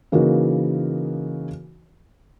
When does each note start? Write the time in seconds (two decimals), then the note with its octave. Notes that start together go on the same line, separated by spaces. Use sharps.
0.12 C#3 E3 A#3 D#4 F#4 A#4